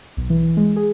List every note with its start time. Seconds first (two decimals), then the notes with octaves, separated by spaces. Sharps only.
0.17 B1
0.30 E3
0.57 G#3
0.76 G#4